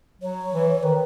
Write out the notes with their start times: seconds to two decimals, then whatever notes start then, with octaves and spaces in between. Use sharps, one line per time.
0.22 F#3 C#5
0.53 E3
0.83 D#3 B4